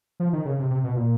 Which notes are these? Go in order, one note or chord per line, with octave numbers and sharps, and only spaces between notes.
F3
D#3
C#3
C3
C3
B2
A#2